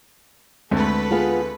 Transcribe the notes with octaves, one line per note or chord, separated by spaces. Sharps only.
D2 G#3 A3 C4 A4 B4
B3 F4 G#4